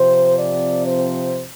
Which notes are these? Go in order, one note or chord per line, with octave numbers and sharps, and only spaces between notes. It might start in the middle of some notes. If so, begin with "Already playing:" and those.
Already playing: C3 F3 C4 C5
D5
C5